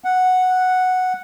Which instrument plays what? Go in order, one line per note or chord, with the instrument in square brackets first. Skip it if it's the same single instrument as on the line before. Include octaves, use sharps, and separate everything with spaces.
[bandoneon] F#5